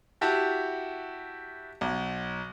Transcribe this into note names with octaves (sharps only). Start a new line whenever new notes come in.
E4 F#4 G4 E5 A5
B1